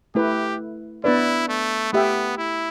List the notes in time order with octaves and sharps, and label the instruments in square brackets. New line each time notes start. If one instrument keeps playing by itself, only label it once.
[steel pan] A3 E4 B4 [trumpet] G4
[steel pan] B3 D4 B4 D5 [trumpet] E4
[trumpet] A3
[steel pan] A3 G4 E5 G5 [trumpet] B3
[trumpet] E4